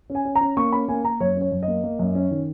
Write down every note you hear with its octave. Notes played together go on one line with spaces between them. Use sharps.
C#4
G#5
C#4
A#5
C#4
A#3 C#6
C#4 B5
A#3 G#5
A#3 A#5
F#2 C#5
C#4 C#5
F#2
D#5
A#3
A#3
F#2
C#4
D#3